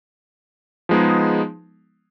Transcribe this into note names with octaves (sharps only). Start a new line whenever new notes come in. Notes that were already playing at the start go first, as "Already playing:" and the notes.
F3 G#3 B3 D#4 G#4